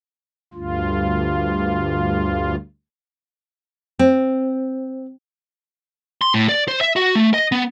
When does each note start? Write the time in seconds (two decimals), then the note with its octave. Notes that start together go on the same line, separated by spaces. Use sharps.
0.54 D2 G2 F4
3.99 C4
6.21 C6
6.34 A2
6.49 D5
6.68 C5
6.81 E5
6.96 F#4
7.15 A3
7.34 D#5
7.52 B3